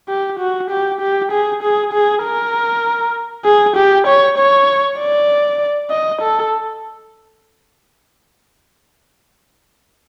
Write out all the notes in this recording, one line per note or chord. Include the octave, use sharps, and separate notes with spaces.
G4
F#4
G4
G4
G#4
G#4
G#4
A#4
G#4
G4
C#5
C#5
D5
D#5
A4